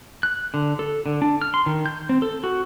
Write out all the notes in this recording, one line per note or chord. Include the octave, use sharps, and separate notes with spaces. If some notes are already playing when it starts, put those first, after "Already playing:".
F#6
D3
A4
D3
D4
F6
C6
D#3
G6
C4
A4
F#4